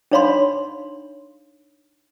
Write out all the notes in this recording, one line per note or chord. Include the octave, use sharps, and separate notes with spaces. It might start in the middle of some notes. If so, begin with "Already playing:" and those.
D4 D#4 C#5 F5 B5 C6